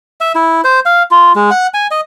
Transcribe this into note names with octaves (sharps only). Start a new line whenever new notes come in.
E5
E4
C5
F5
F4
G#3
F#5
G#5
D#5